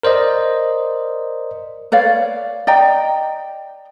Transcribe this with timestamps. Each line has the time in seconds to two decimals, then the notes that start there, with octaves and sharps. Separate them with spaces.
0.03 A#4 C5 D5 D#5
1.92 B4 C#5 D5 F5
2.67 D5 D#5 G5 A#5